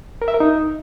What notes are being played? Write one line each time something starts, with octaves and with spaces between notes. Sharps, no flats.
A#4
E5
A#4
D#4